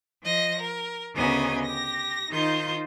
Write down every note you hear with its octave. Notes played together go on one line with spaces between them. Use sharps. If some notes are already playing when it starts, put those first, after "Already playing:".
F3 D#5 A#6
A#4
D2 C#3 B3 D#5 G#5 A#5
G4 A#6
D#3 D#4 F4 C5 D#5 G6